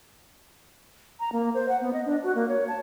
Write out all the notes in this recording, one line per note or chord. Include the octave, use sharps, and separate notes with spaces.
A#5
A#3
C5
F#5
B3
D#5
D4
F#4
A#3
C#5
A5